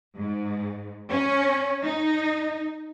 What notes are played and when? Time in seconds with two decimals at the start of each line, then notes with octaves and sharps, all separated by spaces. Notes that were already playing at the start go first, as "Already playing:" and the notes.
0.16 G#2
1.11 C#4
1.84 D#4